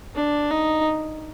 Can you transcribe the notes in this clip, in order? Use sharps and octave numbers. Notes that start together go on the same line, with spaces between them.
D4
D#4